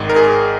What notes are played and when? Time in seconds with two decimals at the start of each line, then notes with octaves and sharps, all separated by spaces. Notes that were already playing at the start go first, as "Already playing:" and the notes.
Already playing: G#1 G#2 D#3
0.09 A#4
0.16 G#4